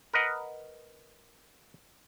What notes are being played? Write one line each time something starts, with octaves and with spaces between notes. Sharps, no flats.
A#4 B4 D#5 F#5